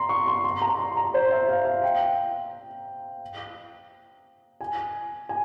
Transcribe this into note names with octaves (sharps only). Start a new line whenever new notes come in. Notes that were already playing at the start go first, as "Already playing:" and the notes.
Already playing: A#5 C6
C#6
C6
C6
A#5
C6
A#5
C5
E5
F5
F5
G5
G#5
G#5